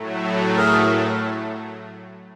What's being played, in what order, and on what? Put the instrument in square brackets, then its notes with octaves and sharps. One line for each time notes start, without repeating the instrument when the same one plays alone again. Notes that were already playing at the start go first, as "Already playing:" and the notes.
Already playing: [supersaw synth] A2 F#3 A3
[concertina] G#4 A#4